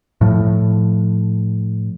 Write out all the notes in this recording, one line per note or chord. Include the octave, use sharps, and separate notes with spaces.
A2 F3